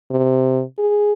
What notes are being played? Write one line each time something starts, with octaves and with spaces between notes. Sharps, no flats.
C3
G#4